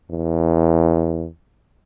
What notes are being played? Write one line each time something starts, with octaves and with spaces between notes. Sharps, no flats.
E2